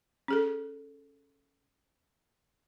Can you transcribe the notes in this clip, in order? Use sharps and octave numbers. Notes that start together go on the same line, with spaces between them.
C#4 G#4 A4